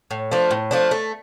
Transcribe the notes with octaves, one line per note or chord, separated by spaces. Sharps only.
A2
F3 A3 D4
A2
F3 A3 D4
A3